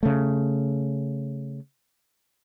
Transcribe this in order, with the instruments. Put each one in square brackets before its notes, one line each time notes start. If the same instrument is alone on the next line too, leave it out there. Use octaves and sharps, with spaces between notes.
[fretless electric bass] C#3 A3